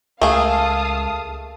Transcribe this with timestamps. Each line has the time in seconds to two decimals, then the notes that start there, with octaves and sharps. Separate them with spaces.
0.22 C#2 A3 A#3 G#4 F5 A5 D#6